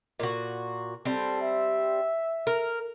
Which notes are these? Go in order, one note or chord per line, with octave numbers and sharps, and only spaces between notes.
A#2 F#4
G3 C4 A4
E5
A#4